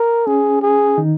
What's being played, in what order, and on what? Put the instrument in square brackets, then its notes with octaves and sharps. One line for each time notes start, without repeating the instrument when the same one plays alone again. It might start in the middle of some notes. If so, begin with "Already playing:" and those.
Already playing: [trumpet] A#4
[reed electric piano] C#4 [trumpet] G#4
[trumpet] G#4
[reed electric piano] D#3 D#4